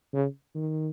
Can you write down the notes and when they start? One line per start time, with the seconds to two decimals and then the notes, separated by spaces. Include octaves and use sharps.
0.13 C#3
0.55 D#3